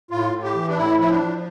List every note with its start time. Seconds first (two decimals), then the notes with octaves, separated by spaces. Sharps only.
0.11 A2 F4
0.33 A2
0.43 G4
0.54 E3
0.68 D4
0.76 A2 E4
1.00 F3 E4
1.11 D4
1.21 F3